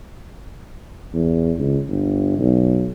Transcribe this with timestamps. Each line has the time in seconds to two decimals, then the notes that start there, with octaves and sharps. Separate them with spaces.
1.13 E2
1.59 C#2
1.88 G1
2.39 B1